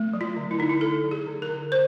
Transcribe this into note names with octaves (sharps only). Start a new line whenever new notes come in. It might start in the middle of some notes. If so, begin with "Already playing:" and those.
Already playing: A3
F#3
F4
D3
E4
D3 D#4
E4
A3 A4
F#3
G#4
D3
A#4
D3
C5